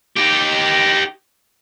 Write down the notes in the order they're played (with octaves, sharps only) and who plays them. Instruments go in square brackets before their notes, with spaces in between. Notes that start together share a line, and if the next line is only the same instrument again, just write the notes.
[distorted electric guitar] D#4 G4